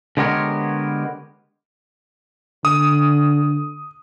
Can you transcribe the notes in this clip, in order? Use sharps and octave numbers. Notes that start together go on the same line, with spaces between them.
D3 G#3 B3 G4 A#4 C#5
D3 D#6